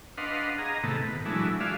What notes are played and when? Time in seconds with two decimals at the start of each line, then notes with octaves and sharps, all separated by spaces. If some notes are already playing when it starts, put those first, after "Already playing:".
0.18 D4 B4 D#5 F5 F#5 C6
0.58 G#4 D#5 A#5
0.83 A2 C3 D#3 A3 B3
1.01 A#2 B4
1.26 E3 F#3 G#3 A3 D4 E4
1.60 F4 F#4 G#4 D5 E5 F5